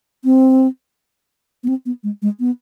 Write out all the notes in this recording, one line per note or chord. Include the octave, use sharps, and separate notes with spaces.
C4
B3
C4
B3
G#3
G#3
B3